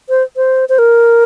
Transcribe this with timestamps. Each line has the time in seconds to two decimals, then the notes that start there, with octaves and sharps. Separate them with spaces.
0.09 C5
0.37 C5
0.69 C5
0.79 A#4